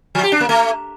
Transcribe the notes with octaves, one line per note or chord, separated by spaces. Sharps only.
F3
G4
D4
A#3
A3